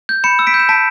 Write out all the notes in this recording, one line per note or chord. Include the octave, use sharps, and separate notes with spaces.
G6
B5 C#7 E7
E6
B6 D7
G6
E7
A5 B6 D7